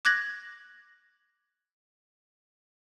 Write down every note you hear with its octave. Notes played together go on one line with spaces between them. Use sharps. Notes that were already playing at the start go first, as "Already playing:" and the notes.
D6 F#6 G#6 A#6 F#7